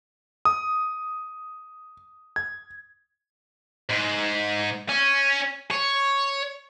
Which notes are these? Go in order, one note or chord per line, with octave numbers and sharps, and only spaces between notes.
D#6
G#6
G#2
C#4
C#5